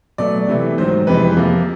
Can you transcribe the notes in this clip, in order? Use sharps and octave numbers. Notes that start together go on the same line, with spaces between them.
B2 F#3 A3 D5
C3 E3 A3
G#2 D#3 F#3 C5
F2 C3 E3 G#3 B4
C3 F3 A#3